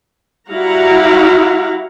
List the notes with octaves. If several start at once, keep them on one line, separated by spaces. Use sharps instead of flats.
G3 E4 F#4 F5 F#5 A#5